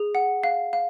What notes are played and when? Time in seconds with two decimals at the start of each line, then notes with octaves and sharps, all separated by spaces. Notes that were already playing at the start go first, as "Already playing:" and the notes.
Already playing: G#4
0.15 F#5
0.44 F5
0.73 F5